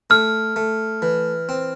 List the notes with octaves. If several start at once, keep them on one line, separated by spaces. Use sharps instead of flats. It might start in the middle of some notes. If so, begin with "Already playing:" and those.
A3 F6
A3
E3
C4